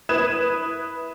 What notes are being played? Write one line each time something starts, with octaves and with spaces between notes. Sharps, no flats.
E4 B4 D#6 G#6 E7